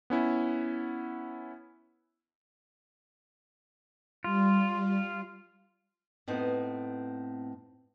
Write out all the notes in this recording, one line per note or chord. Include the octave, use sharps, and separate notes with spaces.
B3 C#4 E4
G3 F4
A2 B3 C4 D#4